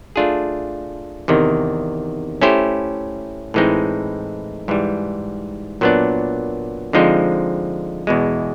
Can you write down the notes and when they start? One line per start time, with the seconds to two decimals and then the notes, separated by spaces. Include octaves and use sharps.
0.16 A3 D4 F4 G#4
1.28 E2 C3 D#3
2.41 A3 C#4 E4 G4 C5
3.54 A2 E3 G#3 C4 D#4
4.68 G#2 E3 G3
5.81 A#2 F#3 B3 D4
6.93 D3 F3 G#3 C4 D#4
8.07 E2 B2 G#3